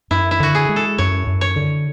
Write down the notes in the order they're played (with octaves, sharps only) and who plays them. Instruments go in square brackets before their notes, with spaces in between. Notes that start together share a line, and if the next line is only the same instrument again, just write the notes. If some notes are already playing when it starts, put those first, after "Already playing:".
[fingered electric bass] F#2 [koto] E4
[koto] E4
[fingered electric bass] D3 [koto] F#4
[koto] G#4
[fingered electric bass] G#3
[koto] A4
[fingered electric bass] F#2 [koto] C#5
[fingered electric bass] F#2
[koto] C#5
[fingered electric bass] D3